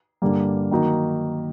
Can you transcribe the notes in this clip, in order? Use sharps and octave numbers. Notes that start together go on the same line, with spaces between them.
G2 D3 G3 A#3
D#3 F#3 A#3 D#4 F#4